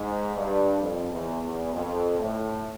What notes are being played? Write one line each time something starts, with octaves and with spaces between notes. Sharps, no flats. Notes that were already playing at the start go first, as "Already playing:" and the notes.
Already playing: G#2
G2
F2
E2
E2
F2
A2